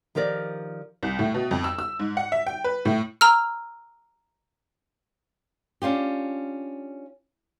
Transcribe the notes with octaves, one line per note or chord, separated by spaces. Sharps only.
D#3 F3 G4 A#4 D5
C2
A2
B2
F2
E6
E6
G#2
F#5
E5
G5
B4
A2
A#5 E6 F6
C#4 D4 F4 G4